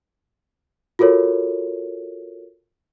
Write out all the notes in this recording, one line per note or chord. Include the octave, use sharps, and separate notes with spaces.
F4 F#4 A4 A#4 C#5